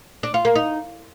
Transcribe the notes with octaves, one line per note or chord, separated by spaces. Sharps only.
D4
F4
A#3
D#4